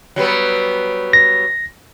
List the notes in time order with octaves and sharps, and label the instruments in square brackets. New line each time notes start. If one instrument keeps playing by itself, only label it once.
[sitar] F#3 G3 B3
[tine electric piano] A#6